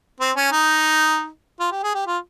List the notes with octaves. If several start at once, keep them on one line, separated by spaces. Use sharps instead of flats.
C4
C#4
D#4
F4
G4
G#4
G4
F4